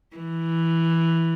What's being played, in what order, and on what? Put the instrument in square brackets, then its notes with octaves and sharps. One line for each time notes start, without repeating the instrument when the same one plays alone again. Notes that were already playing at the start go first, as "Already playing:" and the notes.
[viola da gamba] E3